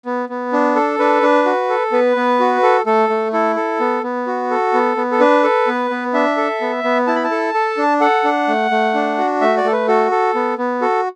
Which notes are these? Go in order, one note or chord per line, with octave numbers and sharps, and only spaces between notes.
B3
B3
D4
A4
D4 B4
D4
F#4
A4
B3 B4
B3
F#4
A4
A3 A4
A3
E4 A4
A4
B3
B3
F#4
A4
B3
B3
A4
D4 B4
A4
B3
B3
D4 E5
A4
B3
B3
E4 A5
B5
A5
A4
A4
D4
A4 F#5
D4
A3
A3
D4
F#4
A3 E5
D5
A3 A4
B4
F#4 A4
A4
B3
B3
F#4 A4